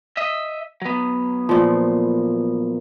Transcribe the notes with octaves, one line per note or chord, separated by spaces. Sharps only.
D#5 E5
F#3 B3
A#2 F3